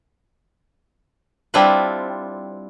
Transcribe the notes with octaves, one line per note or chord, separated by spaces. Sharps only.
G3 C4 D4 E4 F4 B4